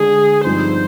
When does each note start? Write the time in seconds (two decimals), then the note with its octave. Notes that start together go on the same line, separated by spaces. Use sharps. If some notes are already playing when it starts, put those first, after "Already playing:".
Already playing: D3 G#3 D4 G#4
0.45 G2 F3 C4 D#4 G4 C5